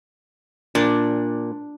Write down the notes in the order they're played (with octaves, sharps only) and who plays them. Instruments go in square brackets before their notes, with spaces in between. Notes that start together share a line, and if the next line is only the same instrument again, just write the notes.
[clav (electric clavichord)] A#2 [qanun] D4